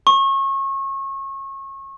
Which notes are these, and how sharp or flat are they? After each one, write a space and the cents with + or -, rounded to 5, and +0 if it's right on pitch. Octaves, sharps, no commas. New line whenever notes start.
C#6 -30